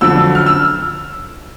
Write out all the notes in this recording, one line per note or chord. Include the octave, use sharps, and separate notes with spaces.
F2 D3 F#3 E6
F6
E6